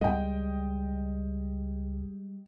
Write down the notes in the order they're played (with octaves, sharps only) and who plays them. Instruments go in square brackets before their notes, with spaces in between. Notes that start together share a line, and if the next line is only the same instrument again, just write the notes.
[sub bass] C#2 [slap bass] G3 G#3 [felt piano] D#5 G5